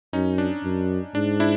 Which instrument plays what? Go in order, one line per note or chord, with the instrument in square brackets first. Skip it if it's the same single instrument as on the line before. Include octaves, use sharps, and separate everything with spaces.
[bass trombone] F#2 [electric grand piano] C#4 D#4
[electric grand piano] D4
[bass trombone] F#2
[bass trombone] G#2 [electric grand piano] D4
[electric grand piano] D4 E4